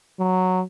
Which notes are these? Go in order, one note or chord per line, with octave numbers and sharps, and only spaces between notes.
F#3